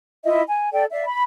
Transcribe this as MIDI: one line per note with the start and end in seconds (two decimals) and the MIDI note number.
0.24 0.41 64
0.24 0.41 65
0.24 0.41 75
0.24 0.41 76
0.48 0.71 80
0.72 0.84 69
0.72 0.84 74
0.72 0.84 79
0.92 1.05 74
0.92 1.05 76
0.92 1.05 77
1.05 1.23 83